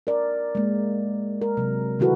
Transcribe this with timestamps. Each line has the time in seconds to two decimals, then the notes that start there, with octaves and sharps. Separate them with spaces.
0.07 A#4 D5
0.55 G#3 A#3
1.42 A#4
1.57 C3 F#3
1.99 D3 D#3 E4 F#4 A4 B4